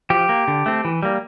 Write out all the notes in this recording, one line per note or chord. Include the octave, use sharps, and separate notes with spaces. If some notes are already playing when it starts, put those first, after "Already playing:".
F3 G4
A#3
D3
A3 C4
E3
G3 A#3